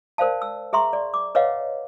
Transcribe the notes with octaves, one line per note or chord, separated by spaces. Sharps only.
A#4 C5 D5 F5 A5
E6
G#4 E5 A#5 C6 C#6
D5
D6
B4 C#5 D#5 F5 F#5